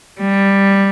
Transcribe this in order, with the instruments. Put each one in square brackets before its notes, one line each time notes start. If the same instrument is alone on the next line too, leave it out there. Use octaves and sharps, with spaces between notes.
[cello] G3